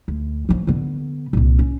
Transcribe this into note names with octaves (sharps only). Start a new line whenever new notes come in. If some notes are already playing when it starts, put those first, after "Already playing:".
D2
F3 F#3
D3 B3
C2 A#2
C#4